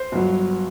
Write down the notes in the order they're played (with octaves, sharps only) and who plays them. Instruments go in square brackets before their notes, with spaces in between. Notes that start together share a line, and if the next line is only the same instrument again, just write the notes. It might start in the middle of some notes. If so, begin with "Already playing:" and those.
Already playing: [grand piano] C5
G1 G2 F#3